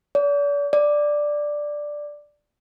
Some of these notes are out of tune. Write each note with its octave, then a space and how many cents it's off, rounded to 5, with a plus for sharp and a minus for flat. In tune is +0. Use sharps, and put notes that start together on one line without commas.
D5 -40
D5 +5